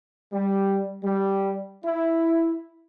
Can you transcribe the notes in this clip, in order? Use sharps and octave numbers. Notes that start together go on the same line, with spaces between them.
G3
G3
E4